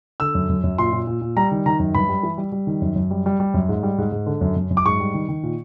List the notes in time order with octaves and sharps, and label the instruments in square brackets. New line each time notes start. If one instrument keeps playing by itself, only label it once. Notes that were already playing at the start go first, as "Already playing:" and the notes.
[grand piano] D3 E6
F#2
F#2
F#2
A#2 C6
A#2
A#2
A#2
G3 A#5
D#3
D#3 A#5
F#2
G2 B5
G3
E3
G3
G3
D#3
F#2
F#2
G3
G3
G3
F#2
G#2
G3
G#2
G#2
D3
F#2
F#2
F#2
D6
G#2 C#6
G3
D#3
D#3
A#2